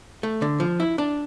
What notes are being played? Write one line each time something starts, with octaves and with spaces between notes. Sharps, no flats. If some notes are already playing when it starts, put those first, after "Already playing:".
A3
D3
F3
E4
D4